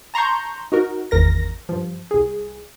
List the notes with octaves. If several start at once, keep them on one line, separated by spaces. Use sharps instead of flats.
A5 A#5 C6 C#6 G6
D#4 F#4 A#4
G#1 E2 A#4 A#6
G2 F3
C2 G#4